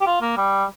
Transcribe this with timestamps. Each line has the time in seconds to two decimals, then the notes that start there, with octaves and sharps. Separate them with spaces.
0.01 G4
0.07 F4
0.22 A#3
0.37 G3